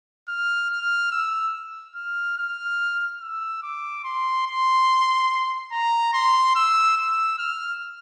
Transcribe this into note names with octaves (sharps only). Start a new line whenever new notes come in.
F6
F6
E6
F6
F6
E6
D6
C6
C6
A#5
C6
E6
E6
F6